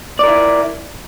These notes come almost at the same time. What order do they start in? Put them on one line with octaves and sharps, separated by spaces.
D5 A#4 E4